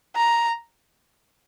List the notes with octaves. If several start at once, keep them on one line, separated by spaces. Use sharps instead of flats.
A#5